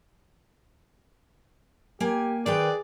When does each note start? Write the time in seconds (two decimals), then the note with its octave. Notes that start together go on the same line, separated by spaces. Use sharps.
2.00 A#3 G4 G#5
2.46 D#3 G#4 B4 D5 G5